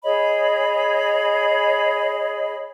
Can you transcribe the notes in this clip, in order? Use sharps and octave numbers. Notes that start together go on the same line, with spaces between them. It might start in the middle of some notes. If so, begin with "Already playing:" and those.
G#4 C#5 D#5 B5